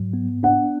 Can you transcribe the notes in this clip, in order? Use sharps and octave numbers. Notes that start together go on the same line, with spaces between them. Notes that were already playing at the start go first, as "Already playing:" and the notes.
Already playing: G#2 F#3
B3
D4 F#5